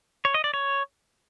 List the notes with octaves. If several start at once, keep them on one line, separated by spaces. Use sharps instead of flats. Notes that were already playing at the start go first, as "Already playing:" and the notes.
C#5
D#5
D5
C#5